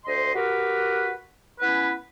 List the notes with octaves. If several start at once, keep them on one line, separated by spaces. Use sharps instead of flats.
D2 C5 D#5 C6
F#4 G4 A#4 B4
B3 C#4 E4 B4